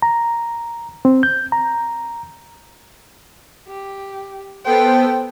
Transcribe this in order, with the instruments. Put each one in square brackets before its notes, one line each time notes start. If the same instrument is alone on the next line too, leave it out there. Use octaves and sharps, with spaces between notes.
[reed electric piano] A#5
C4
G6
A#5
[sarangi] G4
[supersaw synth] B3 A4 C5 [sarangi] G5